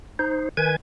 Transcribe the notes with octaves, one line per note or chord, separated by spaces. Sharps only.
D#4 C5
D#3 B4 G#5 G#6